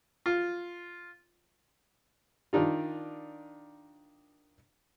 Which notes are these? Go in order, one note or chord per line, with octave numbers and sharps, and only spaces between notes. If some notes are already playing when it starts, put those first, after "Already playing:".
F4
D#3 D4 D#4 F4